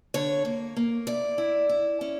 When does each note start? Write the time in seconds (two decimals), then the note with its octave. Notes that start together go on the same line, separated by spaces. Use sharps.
0.14 D3 C#5
0.45 A#3
0.77 A#3
1.07 E4 D5
1.38 E4
1.69 E4
2.01 C#4